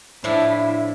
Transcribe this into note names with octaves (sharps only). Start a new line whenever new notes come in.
A2 F3 D4 E4